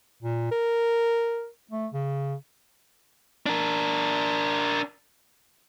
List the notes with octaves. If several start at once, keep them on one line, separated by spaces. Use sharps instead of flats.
A#2
A#4
A3
C#3
D4 A#4